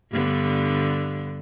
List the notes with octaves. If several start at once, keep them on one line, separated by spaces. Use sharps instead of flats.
G2 D3 B3